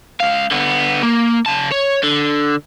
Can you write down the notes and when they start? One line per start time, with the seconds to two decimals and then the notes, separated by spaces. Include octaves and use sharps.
0.20 C#2 F5
0.51 D3 B3
1.03 A#3
1.46 C#3 A5
1.71 C#5
2.03 D3